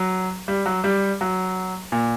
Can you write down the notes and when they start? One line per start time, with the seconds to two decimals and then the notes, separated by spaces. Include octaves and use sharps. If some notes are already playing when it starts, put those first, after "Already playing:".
Already playing: F#3
0.48 G3
0.66 F#3
0.84 G3
1.21 F#3
1.92 A#2